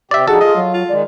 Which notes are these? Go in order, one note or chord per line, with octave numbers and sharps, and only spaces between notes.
C3 G4 D5 E5
F3 D4 D#4 F#4 G#4 A4
F4 D#5
F#3
F4
D#3 G#3 D5